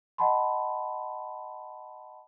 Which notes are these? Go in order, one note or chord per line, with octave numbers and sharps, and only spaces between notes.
D#5 F#5 G5 A5 B5 C6